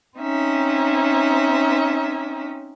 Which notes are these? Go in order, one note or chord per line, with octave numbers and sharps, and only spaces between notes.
C4 C#4 D#4 E5